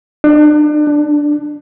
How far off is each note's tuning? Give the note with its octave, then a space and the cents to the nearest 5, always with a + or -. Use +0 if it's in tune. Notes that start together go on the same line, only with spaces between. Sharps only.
D4 +35
D4 +0